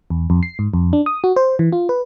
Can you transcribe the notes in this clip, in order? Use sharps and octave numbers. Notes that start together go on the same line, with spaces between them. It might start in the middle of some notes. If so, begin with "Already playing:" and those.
E2
F2
C7
G#2
F2
D4
D#6
F#4
C5
E3
F4
B4